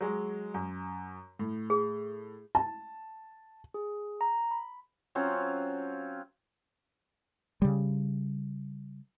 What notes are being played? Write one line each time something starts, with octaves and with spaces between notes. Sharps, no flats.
F#3 G#3
F#2
A2
G#4
A5
G#4
A#5
B5
F#3 C4 C#4 F4
C#3 G3